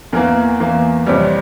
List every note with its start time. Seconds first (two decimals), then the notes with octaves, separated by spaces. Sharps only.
0.13 E2 E3 A#3 A#4
0.60 E2 E3 A#3
1.06 F2 C3 E3 G3 C#5